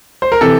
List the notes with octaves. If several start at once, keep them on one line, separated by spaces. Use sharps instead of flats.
C5
A#4
C3 E3 A4